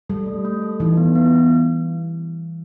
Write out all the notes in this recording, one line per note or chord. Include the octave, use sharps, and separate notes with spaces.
G3 A4
A3
A3
A4
E3 D#4
B3
B3